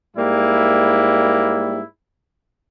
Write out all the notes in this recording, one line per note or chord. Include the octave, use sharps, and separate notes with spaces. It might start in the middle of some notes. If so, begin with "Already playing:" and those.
G#2 G3 A#3 E4